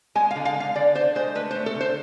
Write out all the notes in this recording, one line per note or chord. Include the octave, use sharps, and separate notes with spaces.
G#3 G#5
F5
D3
F5
D3 F5
D3 D5
D3 C5
G#3 C5
A3 B4
C5
A3
A4
D3 C5